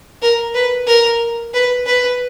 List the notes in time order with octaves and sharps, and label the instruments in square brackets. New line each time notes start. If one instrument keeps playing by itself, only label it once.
[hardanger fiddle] A#4
B4
A#4
B4
B4